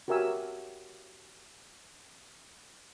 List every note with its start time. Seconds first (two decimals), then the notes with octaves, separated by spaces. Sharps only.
0.08 F#4 G4 A#4 E5 G#5 E6